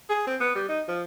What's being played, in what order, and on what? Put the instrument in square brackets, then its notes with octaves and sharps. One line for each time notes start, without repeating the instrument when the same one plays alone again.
[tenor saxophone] G#4
C4
B3
G3
D#4
F3